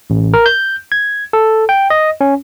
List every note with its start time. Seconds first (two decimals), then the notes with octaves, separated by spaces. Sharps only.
0.10 A1
0.34 A#4
0.46 G6
0.92 G#6
1.33 A4
1.69 G5
1.90 D#5
2.21 C#4